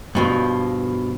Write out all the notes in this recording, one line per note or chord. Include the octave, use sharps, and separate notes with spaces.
G2 B2 F3